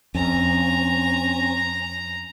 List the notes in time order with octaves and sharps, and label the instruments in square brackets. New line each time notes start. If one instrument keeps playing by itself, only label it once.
[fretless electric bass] F2 [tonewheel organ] C4 C#4 G#5 [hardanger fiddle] A#5